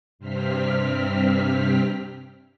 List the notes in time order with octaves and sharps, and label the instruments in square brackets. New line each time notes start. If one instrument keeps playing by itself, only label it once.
[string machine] G2 C3 C4 F6 B6